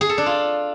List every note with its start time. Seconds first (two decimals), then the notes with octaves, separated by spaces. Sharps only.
0.01 G#4
0.09 A4
0.18 D4
0.26 F4